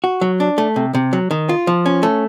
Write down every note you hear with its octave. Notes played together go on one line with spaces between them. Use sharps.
F#4
F#3
D4
A3
C3
C3
F#3
D#3
F4
F3
C#4
A3